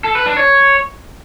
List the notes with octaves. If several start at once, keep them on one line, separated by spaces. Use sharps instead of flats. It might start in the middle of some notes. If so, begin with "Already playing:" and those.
A4
B4
D4
C#5